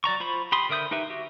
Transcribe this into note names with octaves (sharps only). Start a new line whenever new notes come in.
F#3 D5 A#5 C#6
F4 C5 B5 C#6
G4 B5 C6 D#6
D3 A#4 E5 D#6 G6
D#4 G4 B4 E5
F#4 G4 E5